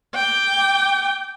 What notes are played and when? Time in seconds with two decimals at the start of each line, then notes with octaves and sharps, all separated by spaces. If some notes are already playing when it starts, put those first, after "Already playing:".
0.15 G5 D6